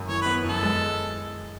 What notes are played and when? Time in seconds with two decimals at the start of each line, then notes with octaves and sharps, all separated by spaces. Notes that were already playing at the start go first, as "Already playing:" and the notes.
Already playing: F#2
0.08 E3 C#5
0.22 B3 B4
0.44 F#2 A4
0.63 G#3